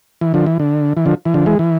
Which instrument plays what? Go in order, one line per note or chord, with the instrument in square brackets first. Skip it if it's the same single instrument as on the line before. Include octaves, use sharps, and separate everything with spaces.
[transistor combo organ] E3
D3 F3
E3
D3
E3
D3 F3
E3
D3 F3
E3 G#3
E3